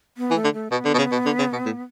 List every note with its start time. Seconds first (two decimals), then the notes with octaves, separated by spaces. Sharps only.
0.17 B3
0.31 E3
0.36 A3
0.44 D3
0.54 A3
0.72 B2 B3
0.85 D3
0.94 B2
0.98 C#3
1.12 B2
1.26 D3
1.39 C#3
1.53 B2
1.66 A2